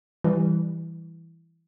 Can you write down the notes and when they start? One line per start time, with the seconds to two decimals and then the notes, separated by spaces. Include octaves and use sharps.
0.24 E3 G3